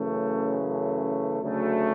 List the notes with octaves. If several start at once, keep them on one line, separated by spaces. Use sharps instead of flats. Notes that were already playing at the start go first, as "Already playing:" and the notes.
Already playing: F#2 C#3 E3 A3
A3
D2 C#3 F#3 A3